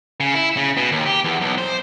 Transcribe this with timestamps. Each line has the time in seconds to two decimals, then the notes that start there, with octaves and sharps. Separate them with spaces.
0.20 C#3
0.34 E4
0.57 C#3
0.77 B2
0.92 D#2
1.06 G4
1.24 E2
1.41 B1
1.58 C5